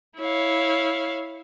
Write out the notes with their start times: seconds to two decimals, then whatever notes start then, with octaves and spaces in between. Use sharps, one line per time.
0.19 E4 C#5 F5